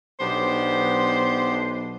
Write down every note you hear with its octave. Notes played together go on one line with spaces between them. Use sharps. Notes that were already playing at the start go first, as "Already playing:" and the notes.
B1 B3 D4 G4 C5